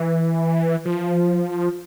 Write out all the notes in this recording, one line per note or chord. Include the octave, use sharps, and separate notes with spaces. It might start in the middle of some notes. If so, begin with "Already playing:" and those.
Already playing: E3
F3